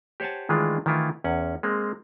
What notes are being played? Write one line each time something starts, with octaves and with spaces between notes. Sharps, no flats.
G4 C5 C#5 F#5 G#5 A5
D#3 E3 G#3 A3 D4 F4
D#3 E3 A3 E4 F4
E2 C#4 F#5
G#3 A#3 C4